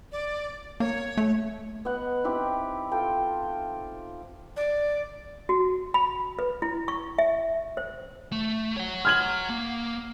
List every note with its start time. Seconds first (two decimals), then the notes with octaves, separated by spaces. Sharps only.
0.12 D5
0.80 A#3 C#5
1.17 A3
1.85 B3 D#5 F#5
2.24 C4 D#4 E4 G4
2.91 F4 A4 G5
4.57 D5
5.49 F#4
5.94 B5
6.39 B4
6.62 E4
6.88 C#6
7.18 E5
7.77 C5
8.32 A3
8.77 C#5 F#5
9.05 F6 G#6 F#7
9.50 A#3